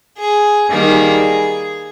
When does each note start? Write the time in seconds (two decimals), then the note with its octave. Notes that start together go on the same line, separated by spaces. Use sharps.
0.18 G#4
0.70 D#3 G3 A#3 G#4